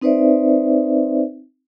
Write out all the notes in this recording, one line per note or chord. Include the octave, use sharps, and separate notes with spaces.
C4 D#4 B4 C5 D5 E5